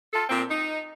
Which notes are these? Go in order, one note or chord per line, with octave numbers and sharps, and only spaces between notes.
F4 A4
A#2 C4
D#4